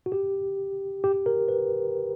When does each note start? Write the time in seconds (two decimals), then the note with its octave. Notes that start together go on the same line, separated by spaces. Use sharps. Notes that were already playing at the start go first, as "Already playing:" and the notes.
0.06 F#4
0.12 G4
1.04 G4
1.26 A#4
1.48 B4